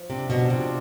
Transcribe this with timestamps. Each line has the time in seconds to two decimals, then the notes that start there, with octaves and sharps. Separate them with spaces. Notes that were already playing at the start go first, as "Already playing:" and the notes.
Already playing: F3
0.09 C3 D4
0.30 B2
0.50 C3 F4